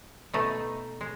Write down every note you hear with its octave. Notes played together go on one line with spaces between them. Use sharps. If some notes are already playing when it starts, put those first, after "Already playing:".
B2 A3 D#4
G#3